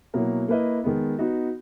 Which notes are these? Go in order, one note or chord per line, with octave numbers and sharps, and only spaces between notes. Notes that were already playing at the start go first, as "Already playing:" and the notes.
B2 F#3 A#3 E4 A#4
A#3 E4 B4 D#5
D#3 G#3 B3
B3 D#4 F#4